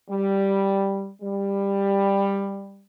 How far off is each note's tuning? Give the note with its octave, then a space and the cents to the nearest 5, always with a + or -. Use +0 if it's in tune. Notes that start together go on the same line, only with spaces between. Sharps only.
G3 +0
G3 +15